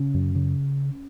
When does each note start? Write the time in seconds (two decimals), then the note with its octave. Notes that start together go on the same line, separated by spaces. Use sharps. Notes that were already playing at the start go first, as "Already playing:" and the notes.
Already playing: C#3 C#4
0.14 F#2
0.35 C#3